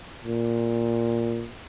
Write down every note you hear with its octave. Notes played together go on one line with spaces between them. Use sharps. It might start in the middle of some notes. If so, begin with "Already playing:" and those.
A#2